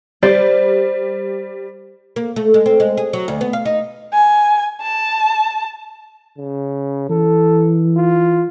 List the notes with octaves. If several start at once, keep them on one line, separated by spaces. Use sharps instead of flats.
G3 C5 D5
A#3
A3
G#3
C4
G#3
G#4
F#3
D2
B3
F5
D#4
G#5
A5
C#3
E3 A4
F4